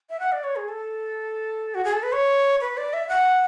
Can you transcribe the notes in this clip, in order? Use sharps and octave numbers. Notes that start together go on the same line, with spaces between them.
E5
F#5
D5
C#5
G#4
A4
F#4
G#4
A4
B4
C#5
B4
D5
E5
F#5